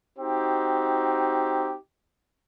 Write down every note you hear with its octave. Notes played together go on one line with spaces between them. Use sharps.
C4 D#4 F#4 G4